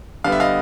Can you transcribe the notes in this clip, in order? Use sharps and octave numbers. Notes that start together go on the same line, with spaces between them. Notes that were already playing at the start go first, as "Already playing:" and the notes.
D3 G3 B3 F5
E5
D#5 F5